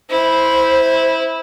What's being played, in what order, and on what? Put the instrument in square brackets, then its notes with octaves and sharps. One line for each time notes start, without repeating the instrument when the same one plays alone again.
[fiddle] E4 [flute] C5